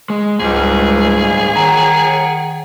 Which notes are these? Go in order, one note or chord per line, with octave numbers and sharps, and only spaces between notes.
G#3
C#2 G#2 G3 G#4
D#3 F#5 A#5